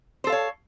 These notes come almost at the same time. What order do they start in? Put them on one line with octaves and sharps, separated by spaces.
C5 A4 F5 C#5